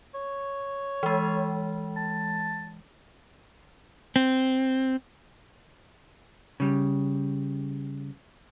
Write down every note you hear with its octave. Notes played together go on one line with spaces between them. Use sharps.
C#5
E3 G#3
A5
C4
C#3 G3